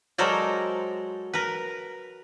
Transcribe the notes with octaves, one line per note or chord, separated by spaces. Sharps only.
F#3 G#3 A4 A#4 C5 D5
A#4 B4